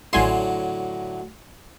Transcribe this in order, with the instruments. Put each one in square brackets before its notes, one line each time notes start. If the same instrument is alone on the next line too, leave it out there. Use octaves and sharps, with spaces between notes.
[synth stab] A1 G#5 C6 [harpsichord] A2 D3 F#3